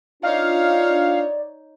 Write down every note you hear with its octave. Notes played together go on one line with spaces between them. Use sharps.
D4 D#4 F4 C#5 D5 F5